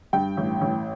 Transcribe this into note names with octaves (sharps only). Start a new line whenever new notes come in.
G2 G5
A1
A1